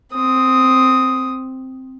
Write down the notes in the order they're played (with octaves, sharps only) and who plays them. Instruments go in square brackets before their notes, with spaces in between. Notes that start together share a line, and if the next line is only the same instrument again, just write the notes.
[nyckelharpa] C4 D#6